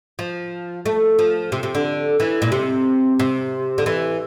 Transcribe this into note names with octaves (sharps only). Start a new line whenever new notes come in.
F3
A3
F3
C3
C3
D3
E3
A#2
C3
C3
D3
E3